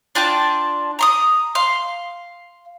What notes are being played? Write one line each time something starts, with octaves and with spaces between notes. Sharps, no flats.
D4 F4 G5 A5
A#5 C6 D#6
F5 C6